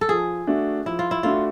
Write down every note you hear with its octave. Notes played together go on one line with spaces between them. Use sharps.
A4
F3 G#4
A3 D4 F#4
F3 E4
F4
E4
A3 D4 F4 F#4